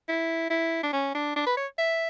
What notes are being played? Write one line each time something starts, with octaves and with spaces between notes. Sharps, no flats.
E4
E4
D4
C#4
D4
D4
B4
C#5
E5